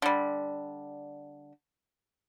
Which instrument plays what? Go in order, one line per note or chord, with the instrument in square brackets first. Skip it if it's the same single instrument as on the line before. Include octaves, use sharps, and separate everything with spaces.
[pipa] D3 G3